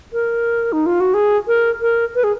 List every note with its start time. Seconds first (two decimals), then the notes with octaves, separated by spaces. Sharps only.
0.13 A#4
0.73 D#4
0.86 F4
1.00 F#4
1.14 G#4
1.48 A#4
1.81 A#4
2.15 B4
2.24 G#4